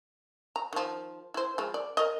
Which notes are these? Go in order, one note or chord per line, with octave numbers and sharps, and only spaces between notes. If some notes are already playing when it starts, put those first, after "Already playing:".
A#5
D#3 F3
E4 C5
F3 G#3
D5
A#4 D#5